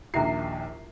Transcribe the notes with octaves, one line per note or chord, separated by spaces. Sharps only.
A#1 D#2 E4 E5 A#5 C7